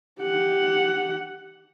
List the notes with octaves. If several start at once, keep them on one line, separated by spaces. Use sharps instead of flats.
G4 F#5